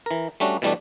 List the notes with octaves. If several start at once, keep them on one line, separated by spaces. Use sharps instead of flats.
E3 A#4
G3 A3 C#4 D4 F#4
B2 E3 G3 A3 D4